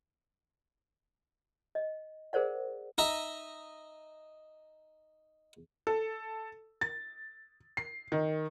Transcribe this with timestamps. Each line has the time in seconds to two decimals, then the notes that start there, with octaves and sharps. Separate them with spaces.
1.75 D#5
2.33 G#4 A#4 C5 D5 F#5
2.98 D#4 D#5 E5 A#5
5.87 A4
6.81 A6
7.77 C7
8.12 D#3